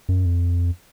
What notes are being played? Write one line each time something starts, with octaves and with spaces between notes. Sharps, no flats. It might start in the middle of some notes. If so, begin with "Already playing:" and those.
F#2
F2